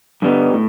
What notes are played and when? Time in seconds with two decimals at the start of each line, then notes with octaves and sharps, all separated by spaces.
0.22 G2 D3 G3 B3 D#4
0.53 A2